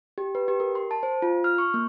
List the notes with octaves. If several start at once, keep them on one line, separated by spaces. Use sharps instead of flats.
G4
B4
G4
A#4
C6
A5
C5
F4
F6
C#6
A#3